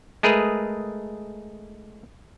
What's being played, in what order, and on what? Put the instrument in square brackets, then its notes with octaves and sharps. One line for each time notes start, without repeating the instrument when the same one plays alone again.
[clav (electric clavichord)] G#3 A3 G#4 A#4 B4